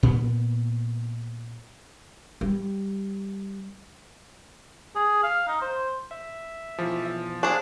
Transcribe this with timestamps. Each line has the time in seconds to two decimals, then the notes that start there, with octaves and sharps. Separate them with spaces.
0.03 A#2 B3
2.41 G3
4.96 G#4
5.23 F5
5.48 D#4
5.62 C5
6.11 E5
6.78 B1 E3 F3
7.43 D4 G#4 C5 F5 A5 F#6